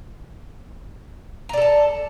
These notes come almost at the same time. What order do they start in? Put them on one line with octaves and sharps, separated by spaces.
A#5 D5 A4 A5